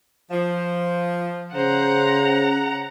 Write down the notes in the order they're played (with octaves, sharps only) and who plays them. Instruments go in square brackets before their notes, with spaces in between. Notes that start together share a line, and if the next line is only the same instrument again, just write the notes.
[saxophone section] F3
[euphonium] C#3 [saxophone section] C5 [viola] F#5 A#5